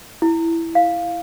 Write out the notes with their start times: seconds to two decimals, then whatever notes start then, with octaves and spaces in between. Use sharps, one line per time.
0.22 E4
0.75 F5